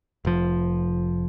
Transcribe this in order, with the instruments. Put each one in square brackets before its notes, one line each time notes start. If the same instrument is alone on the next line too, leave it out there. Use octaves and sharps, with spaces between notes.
[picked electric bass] F1 F3